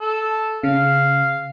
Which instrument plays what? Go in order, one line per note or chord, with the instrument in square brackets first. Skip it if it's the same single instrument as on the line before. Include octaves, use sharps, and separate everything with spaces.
[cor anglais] A4
[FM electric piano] C#3 [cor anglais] F5